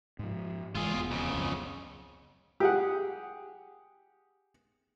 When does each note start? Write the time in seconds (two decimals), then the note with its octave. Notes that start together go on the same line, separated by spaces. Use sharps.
0.19 G#2 F3
0.75 F#1 E3 G#3 F4 G#4
0.93 E1 B3
1.11 F2 C#3
1.33 C#2 F#2
2.60 G4 G#4 F#5